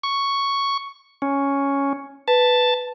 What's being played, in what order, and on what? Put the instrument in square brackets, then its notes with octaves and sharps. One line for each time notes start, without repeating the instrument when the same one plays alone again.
[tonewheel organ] C#6
C#4
[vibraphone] B4 [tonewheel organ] A5